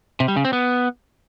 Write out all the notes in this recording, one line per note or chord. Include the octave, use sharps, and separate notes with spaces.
C3
G3
C#3
C4
B3